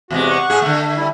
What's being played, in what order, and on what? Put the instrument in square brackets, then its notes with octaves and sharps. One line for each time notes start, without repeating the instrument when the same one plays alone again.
[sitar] E2 C3 G#3 [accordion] F#4
[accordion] F#5 C#6
[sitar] A2 G#4
D3 A3
[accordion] G3 E4